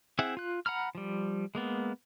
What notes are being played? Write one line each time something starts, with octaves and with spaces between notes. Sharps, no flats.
C4 E4 G#4 E5 F#5
F4 F#6
F#5 A#5 B5 F6
F3 G3
G#3 A#3 B3